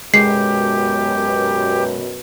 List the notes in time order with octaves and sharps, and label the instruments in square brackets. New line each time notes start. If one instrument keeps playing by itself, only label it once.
[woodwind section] F#2 B2 [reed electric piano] G#3 [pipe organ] G4 [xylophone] C7